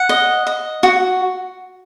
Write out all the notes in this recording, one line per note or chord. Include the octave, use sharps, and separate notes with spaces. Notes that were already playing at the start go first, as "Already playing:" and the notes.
Already playing: F#5
D#5
D#5
F#4